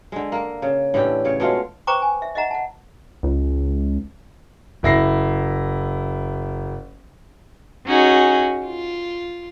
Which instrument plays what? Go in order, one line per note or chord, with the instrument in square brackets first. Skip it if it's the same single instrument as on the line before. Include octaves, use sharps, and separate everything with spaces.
[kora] D3 G#3
A#3
C#3
A2 D3 E3 G4
C#3 C#5
B2 G#3 A3 F4
[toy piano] B4 C5 G5 A#5 C#6 D6
G#5
E5
D#5 E5 F#5 A#5
F#5 A5
[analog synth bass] C#2
[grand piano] F#1 E4 A#6 C7
[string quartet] C#4 D#4 F#4 G#4
F4